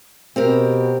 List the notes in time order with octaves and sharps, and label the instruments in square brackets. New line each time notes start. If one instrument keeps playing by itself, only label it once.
[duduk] B2 [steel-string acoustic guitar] C4 G4 A#4